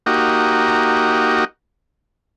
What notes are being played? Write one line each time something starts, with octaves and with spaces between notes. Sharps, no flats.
A#3 D#4 F#4 G4